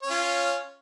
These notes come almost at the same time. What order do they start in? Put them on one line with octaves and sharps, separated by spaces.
C#5 C#4 F4